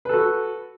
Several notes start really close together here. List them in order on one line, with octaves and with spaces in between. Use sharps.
B4 A4 F#4